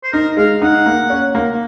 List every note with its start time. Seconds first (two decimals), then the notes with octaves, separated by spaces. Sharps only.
0.04 C5
0.13 D#4 A#4
0.37 G#3 F5
0.62 D#4 F#5
0.86 A#3
1.10 C#4
1.35 A#3